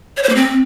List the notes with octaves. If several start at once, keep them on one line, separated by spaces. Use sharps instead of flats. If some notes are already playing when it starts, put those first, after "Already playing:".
C#5
C5
A#3
C4